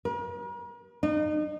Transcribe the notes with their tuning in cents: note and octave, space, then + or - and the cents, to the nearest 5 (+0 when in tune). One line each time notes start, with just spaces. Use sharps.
A#4 +45
D#4 -40